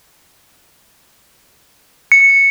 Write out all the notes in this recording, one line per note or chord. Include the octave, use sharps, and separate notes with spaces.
C#7